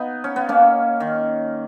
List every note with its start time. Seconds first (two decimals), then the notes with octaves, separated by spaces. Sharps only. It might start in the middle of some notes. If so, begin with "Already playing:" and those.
Already playing: B3 D#4
0.24 C#4
0.36 B3
0.49 A#3 C#4
1.00 D#3